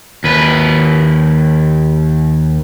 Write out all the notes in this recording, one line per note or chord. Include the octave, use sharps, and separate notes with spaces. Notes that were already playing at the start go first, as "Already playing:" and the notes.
D#2 B4